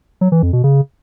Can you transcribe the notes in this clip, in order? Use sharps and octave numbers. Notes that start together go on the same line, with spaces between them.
F#3
E3
F2
B2
C#3